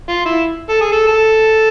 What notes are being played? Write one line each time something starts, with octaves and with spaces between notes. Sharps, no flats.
F4
E4
A4
G#4
A4
A4